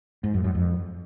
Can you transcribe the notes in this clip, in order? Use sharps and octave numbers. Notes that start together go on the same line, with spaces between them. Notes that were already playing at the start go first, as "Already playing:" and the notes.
G#2
F#2
F#2
F2